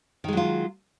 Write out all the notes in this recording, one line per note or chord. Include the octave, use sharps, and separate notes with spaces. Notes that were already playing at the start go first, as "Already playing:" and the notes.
D#3 F#3 G#3 F4